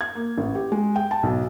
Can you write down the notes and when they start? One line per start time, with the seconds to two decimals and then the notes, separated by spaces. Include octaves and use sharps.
0.01 G#6
0.15 A#3
0.38 A1
0.55 G4
0.72 G#3
0.96 G5
1.11 A5
1.23 B1